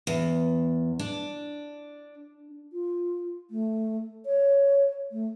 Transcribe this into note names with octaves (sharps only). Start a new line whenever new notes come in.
E2
D4
F4
A3
C#5
A3